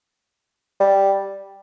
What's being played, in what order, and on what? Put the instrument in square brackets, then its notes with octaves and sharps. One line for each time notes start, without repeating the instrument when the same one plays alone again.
[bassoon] G3